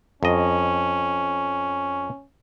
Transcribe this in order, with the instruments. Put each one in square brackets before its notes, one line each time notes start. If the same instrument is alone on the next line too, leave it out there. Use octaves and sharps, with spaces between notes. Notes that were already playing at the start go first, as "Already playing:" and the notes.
[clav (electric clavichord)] F2 D#5 [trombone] C#4